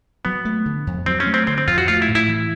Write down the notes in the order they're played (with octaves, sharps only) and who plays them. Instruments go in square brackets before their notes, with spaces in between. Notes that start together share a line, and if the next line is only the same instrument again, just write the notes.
[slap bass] F#3 [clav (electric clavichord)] B3
[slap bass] A3
D3
F2
[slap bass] F#3 [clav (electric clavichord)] C4
[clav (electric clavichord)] C#4
[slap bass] A3
[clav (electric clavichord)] C4
[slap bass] D3 [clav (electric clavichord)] C4
[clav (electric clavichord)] C4
[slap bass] F2 [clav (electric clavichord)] F4
[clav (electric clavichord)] F#4
[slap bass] A3 [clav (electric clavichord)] F4
[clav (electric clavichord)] E4
[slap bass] A2
[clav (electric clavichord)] E4
[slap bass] E3